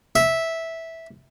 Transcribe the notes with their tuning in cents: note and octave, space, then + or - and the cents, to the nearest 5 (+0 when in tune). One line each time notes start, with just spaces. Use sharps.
E5 -10